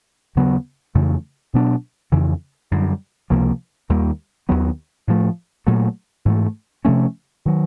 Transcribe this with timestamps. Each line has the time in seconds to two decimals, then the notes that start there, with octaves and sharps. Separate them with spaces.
0.36 D#2 C#3 F#3 B3
0.95 F2 C#3 E3 A3
1.54 B2 F#3 B3 D4
2.12 F2 C#3 E3
2.71 F#2 D3 G3
3.30 C#2 C3 F3 A#3
3.89 D#2 D#3 G3 A#3
4.49 D#2 D#3 F#3 B3
5.07 A2 F3 A3
5.67 A#2 F#3 A3
6.25 G#2 E3 A3
6.85 C3 F3 A3 C#4
7.45 D#3 F#3